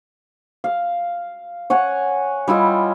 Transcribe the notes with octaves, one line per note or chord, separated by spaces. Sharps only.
F5
C#5 F#5 G#5
G3 E4 F4 D#5